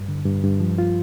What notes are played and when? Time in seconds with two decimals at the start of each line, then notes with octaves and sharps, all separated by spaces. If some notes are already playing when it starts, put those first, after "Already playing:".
Already playing: G2
0.08 D3
0.26 G2
0.43 G2
0.60 F3
0.78 F4